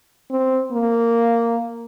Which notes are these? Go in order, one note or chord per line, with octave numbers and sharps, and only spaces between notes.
C4
A#3